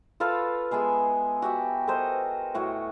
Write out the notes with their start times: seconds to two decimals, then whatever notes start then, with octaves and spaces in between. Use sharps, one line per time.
0.20 F4 A4 B4 F5
0.71 G#3 B3 G#4 E5
1.42 F#4 G4 E5
1.87 A4 A#4 C5 D#5
2.54 A2 F#4 C#5